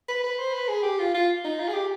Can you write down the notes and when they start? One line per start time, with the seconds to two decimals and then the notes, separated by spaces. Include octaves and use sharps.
0.08 B4
0.24 B4
0.39 C5
0.53 B4
0.68 G#4
0.83 G4
0.99 F4
1.14 F4
1.45 D#4
1.59 F4
1.68 G#4
1.74 G4